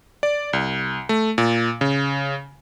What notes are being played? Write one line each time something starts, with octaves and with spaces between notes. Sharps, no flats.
D5
C2
A3
A#2
C#3